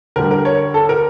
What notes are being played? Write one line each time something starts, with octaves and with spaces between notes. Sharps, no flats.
D3 G3 A#4
A#4
C#5
A4
A#4